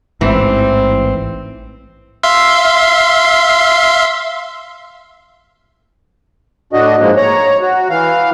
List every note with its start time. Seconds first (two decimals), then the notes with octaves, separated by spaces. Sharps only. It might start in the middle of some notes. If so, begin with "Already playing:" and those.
0.21 A1 G#2 E3 C4
2.23 E5 F5 C6
6.73 A2 D4 F#4 D#5
7.00 G#2 F3 G#3 A#3
7.17 C#5 A#5
7.61 F#4
7.90 E3 F5